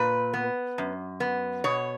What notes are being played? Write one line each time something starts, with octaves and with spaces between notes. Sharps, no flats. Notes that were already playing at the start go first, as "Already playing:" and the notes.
Already playing: A#2 B4
B3
F#2
B3
B2 C#5